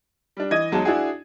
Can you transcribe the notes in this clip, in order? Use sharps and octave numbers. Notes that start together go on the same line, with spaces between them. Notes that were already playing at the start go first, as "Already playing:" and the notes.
G3 D4
E3 D#5 G#6 D#7
E2 F#3 G#3 D#4 A5
D4 E4 F#4 G#4